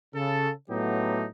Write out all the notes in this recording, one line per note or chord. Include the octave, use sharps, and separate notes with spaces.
C#3 A4
A2 F#3 A3 B3 D#4 G4